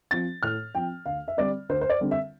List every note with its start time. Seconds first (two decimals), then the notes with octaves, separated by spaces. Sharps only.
0.11 F3 C4 A6
0.43 A2 F6
0.75 F3 C4 G5
1.06 D2 F5
1.28 E5
1.37 D3 G3 C4 D5
1.69 D2 C5
1.81 C5
1.89 D5
2.01 D3 G3 C4
2.11 E5